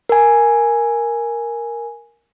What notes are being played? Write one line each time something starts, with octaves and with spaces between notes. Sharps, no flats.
A#4 G#5